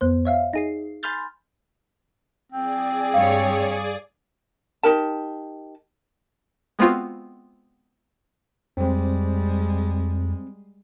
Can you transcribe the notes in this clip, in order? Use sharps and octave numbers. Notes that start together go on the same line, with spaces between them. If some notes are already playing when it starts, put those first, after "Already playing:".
F2 B3 C5
C#5 E5 F5
D#4 G#4 C7
G#5 B5 C6 F6 G6 A6
C4 G#4 D5 G#5
G2 G3 C#5 F5
D#4 G4 A#4 A5
G#3 B3 C4 F4 F#4
F2 G3 G#3 C4